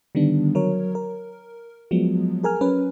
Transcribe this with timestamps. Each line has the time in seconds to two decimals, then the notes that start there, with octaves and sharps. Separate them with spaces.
0.15 D3 D#3 G3 B3 D4
0.55 F#3 A#4 C#5
0.95 A#4
1.91 F3 F#3 G#3 B3
2.43 G#4 A#4 G#5 F6
2.61 F#3 C#4 B4